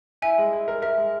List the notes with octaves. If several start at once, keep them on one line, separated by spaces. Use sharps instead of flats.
E4 E5 G#5
G#3
E4
A#4
A#4 E5
G#3